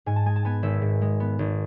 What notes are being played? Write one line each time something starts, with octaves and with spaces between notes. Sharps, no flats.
G#2 G#5
A5
G#3 G#5
A5
B3 G#5
G#1 E5
G#2
G#3
B3
G#1